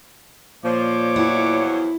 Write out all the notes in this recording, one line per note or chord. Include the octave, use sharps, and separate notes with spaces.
A#2 F3 C#5 D5 D6
E2 F3 F#3 E4